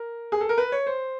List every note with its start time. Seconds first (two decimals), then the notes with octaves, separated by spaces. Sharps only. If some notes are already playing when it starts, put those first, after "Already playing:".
Already playing: A#4
0.32 G#4
0.41 A4
0.49 A#4
0.58 B4
0.72 C#5
0.86 C5